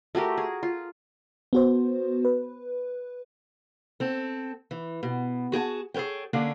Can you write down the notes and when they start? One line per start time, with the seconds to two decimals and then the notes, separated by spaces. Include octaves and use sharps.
0.15 A3 F#4 G4 A#4
0.38 G#4
0.63 F4
1.53 B3 F#4 C5
2.25 B4
4.00 C4 A4
4.71 E3
5.03 B2
5.52 F#4 G#4 G5 A5
5.94 G#4 A4 B4 C#5 G5
6.33 D3 A#3 C#4 D4